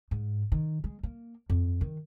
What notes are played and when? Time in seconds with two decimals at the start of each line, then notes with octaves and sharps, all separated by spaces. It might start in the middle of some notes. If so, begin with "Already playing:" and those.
0.11 G#2
0.52 D#3
0.84 G#3
1.03 A#3
1.50 F2
1.81 D#3